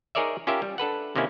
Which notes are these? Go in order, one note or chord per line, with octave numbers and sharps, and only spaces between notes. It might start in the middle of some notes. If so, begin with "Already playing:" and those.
D#4 G#4 A#4 C#5 D5 E5
C#4 F4 G4 A#4 E5
G3
D4 A4 B4 F#5
C3 D#3 A#3 C#4 E4